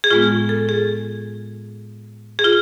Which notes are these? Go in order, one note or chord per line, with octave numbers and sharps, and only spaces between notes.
G#4
A2 G#3 B3 F4
A4
G#4
G#4
F4